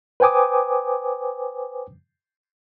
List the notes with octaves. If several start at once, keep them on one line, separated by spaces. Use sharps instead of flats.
B4 C5 G5 G#5 D6 D#6